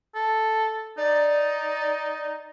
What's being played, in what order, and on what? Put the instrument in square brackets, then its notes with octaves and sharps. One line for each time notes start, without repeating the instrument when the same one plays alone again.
[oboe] A4
[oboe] D#4 [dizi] D5